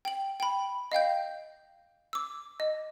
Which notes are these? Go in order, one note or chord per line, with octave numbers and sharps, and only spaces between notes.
G5 F#7
G5 B5
D#5 F5 G5 G6
D6 E6
D#5